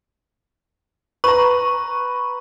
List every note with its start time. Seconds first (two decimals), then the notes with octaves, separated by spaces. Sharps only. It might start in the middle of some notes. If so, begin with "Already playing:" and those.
1.24 B4 A#5 C#6